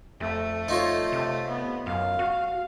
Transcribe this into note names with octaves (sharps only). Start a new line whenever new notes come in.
F2 A3
D#4 F4 C#5
C3
B3
F#2 F5
F#4